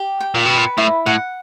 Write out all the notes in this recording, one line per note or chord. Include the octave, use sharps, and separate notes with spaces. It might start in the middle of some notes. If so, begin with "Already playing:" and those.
Already playing: G4
G5
A#2
B2 B4
A#2
A2 E4
A2 F#5